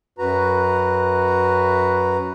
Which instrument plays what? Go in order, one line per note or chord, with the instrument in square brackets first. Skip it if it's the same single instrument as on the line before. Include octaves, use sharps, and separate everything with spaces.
[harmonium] F#2 F#4 B4 A#5